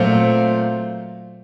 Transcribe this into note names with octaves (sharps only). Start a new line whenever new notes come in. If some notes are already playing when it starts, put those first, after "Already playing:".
Already playing: A#2 F#3 A3 C4 F4